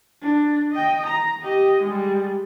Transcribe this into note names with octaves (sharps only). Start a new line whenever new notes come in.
D4
D#5 G5
A#5
G4 D#5
G3 G#3